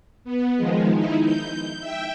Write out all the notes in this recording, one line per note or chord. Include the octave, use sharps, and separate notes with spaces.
B3
D#3 F3 G#3
D#4 E4
G6
E5 G5